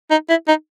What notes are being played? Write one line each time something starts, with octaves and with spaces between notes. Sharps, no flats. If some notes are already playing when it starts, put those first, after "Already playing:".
D#4
E4
D#4